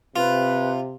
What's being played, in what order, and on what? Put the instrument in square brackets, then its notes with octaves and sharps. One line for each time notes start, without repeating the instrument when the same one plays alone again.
[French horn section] C3 [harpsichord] F4 [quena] B4